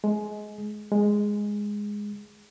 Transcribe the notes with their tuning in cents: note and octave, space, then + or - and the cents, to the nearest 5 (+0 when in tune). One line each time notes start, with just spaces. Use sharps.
G#3 +20
G#3 -5